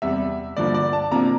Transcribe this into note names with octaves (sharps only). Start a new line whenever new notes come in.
E2 C3 G3 E5
G2 D3 F3 A#3 D5
D5
A5
C3 F3 A#3 D4 A#5